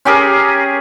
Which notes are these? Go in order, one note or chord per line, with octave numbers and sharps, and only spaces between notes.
C#4 G4 G#4 A#4